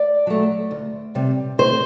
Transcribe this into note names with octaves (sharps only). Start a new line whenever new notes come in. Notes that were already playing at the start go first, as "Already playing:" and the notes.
Already playing: D5
F#3 A3
D2
C3 G3
D2 C5